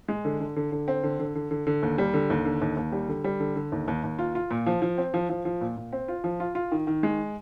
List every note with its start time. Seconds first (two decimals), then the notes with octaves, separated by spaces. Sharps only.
0.08 G#3
0.25 D3
0.40 D3
0.56 D3
0.72 D3
0.88 C4
1.03 D3
1.19 D3
1.35 D3
1.51 D3
1.67 D3
1.83 D#2
1.98 G3
2.14 D3
2.30 D#2
2.45 D3
2.61 D#2
2.77 D#2
2.92 G3
3.09 D3
3.24 G3
3.40 D3
3.56 D3
3.72 D#2
3.88 D#2
4.04 D#2
4.19 F4
4.35 F4
4.51 A#2
4.66 F3
4.82 F3
4.98 C4
5.14 F3
5.29 F3
5.45 F3
5.61 A#2
5.77 A#2
5.93 C4
6.08 F4
6.24 F3
6.40 F4
6.55 F4
6.72 D#3
6.87 D#3
7.03 G#3